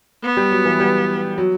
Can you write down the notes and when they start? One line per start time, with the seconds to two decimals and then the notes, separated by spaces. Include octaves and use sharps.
0.23 B3
0.37 G3
0.51 F#3
0.65 E3
0.80 G3
1.38 F#3